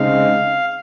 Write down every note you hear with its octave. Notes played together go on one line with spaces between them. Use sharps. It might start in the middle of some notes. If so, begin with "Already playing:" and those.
Already playing: C#3 G#3 C4 D#4 F5